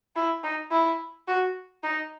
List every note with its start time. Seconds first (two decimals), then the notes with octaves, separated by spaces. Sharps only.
0.16 E4
0.44 D#4
0.71 E4
1.28 F#4
1.83 D#4